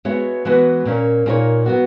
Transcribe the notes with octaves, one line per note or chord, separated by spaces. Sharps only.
G#3 B3 F#4 C#5 E5
E3 G#3 B3 F#4 B4
A#2 A#3 C#4
A#2 A#3 D#4 A#4 C#5
F#3 B3 F#4